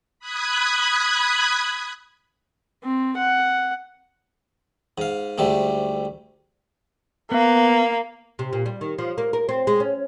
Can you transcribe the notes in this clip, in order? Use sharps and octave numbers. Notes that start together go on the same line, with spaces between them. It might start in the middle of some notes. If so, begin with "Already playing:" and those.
B5 D#6 F#6 G#6
C4
F#5
G#2 F5
D2 G#2 G3 A3
A#3 B3
C3
A#2
G3
D#3
F3
A#3
A#4
C4
G#3
C#4